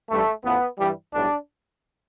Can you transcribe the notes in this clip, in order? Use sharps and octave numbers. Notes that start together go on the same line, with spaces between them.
A1 G2 E3 G3 A3
A1 A2 F3 B3
G2 E3 G3
B1 A2 G3 D4